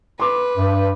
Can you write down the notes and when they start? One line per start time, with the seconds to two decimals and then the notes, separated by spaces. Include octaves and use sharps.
0.20 B4 C6 D6
0.57 G2